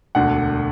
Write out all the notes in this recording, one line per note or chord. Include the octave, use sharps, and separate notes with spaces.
E1 D2 D3 F#5